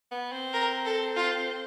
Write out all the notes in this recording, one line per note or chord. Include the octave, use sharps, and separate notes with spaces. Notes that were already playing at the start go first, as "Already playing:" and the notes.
B3
C4
A#4
A4
F4